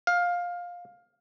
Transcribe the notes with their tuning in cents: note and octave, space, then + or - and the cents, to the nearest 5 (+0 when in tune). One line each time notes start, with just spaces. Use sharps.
F5 +15